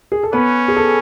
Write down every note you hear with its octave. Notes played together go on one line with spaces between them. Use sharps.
G#4
A4
B3 C#4 B4
G#4
A4